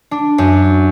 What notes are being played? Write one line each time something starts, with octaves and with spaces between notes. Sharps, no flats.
D4
F#2